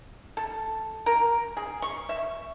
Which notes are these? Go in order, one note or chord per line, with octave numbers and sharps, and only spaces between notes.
A4
A#4
G#4
C#6
E5